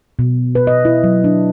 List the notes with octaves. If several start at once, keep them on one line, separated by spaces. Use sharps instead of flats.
B2
B4
D#5
E4
F#3
D4